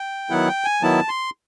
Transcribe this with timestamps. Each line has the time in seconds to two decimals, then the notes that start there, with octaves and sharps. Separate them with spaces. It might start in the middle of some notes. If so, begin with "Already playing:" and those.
Already playing: G5
0.30 D#3 F#3 B3 E4 F#5
0.48 G5
0.65 G#5
0.82 D#3 F#3 B3 E4 A5
1.09 C6